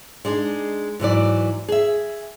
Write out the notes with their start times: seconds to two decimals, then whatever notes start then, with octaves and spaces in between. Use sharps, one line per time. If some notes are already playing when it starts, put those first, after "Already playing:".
0.25 G#3 D4 D#4 G#4
1.00 G#2 E3 F#3 D5
1.69 G#4 E5